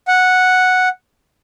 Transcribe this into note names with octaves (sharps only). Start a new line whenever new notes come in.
F#5